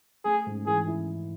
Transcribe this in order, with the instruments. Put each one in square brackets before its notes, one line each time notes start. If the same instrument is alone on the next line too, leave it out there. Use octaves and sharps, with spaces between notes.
[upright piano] A3 [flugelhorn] G#4
[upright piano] G#2
[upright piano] E3 [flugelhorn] G#4
[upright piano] E4